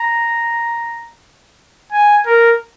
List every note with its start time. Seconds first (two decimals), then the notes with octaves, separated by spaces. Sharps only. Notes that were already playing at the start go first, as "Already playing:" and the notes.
Already playing: A#5
1.92 G#5
2.27 A#4